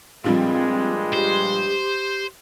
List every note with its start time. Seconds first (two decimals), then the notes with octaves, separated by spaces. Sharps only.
0.24 G2 A#2 F3 G3 G#3 C4
1.13 G4 C5